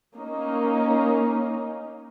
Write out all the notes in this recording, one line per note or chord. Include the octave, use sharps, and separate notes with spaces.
A#3 C#4 D#4